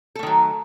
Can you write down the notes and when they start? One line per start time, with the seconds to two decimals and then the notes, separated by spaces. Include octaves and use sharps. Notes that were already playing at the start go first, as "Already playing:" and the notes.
0.15 A4
0.19 A3
0.23 D#3
0.26 F#3